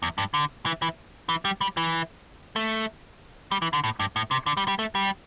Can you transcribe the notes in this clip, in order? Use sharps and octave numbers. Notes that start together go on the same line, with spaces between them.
E2
G2
D3
E3
E3
E3
G3
G3
E3
A3
G3
E3
D3
A2
G2
A2
C3
D3
G3
G3
A3
G3